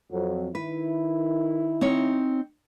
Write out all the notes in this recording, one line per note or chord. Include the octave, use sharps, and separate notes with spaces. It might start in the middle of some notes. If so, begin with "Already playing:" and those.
F2 F#3
D#3 E4 B4
C4 D#4 C#5